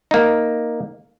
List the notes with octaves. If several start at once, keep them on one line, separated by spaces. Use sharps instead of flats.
A#3 D#4